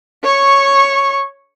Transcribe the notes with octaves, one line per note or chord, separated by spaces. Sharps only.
C#5 C#6